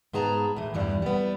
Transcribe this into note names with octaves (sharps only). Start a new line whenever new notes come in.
G#2 B3 G#4 A5 A#5
A2 E3
E2 G2 E3 G3
G3 B3